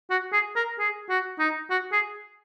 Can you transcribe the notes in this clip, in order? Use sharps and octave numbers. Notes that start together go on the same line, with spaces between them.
F#4
G#4
A#4
G#4
F#4
D#4
F#4
G#4